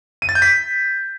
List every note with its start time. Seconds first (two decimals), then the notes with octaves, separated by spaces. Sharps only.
0.22 D#7
0.29 A6
0.35 G6
0.42 B6